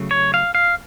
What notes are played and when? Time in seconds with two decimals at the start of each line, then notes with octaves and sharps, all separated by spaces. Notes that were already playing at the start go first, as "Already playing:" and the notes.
Already playing: C#3 F#3 A3
0.11 C#5
0.34 F5
0.55 F5